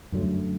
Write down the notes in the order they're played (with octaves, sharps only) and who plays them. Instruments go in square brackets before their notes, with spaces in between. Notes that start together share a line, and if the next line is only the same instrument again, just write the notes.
[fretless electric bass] F#2 D3 F#3 A3